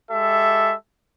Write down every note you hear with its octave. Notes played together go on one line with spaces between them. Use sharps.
G#3 G4 A4 E5